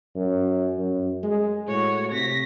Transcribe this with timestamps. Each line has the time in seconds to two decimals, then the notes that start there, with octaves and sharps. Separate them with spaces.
0.16 F#2
0.78 F#2
1.23 G#3
1.68 A2 F#4 C#5
2.12 C3 A#6 B6